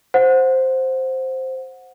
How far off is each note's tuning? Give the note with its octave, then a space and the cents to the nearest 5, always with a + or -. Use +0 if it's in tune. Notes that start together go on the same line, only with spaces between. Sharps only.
C5 +0 F#5 -15